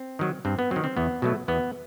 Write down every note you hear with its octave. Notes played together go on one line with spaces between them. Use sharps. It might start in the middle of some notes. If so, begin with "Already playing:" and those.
Already playing: C4
D#3 F#3
G2 C4
B3
D#3 F#3 C4
C4
E2 B3
B2 F#3 A3
E2 B3